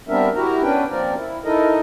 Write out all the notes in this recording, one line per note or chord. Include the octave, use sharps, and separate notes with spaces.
G3 B3 C4 D4 A#4 E5
E4 F#4 G4 A#4 A#5
B3 C#4 D4 B4 G5
F3 A#3 C4 A#4 D5
E4
D#4 E4 A4 A#4 D#5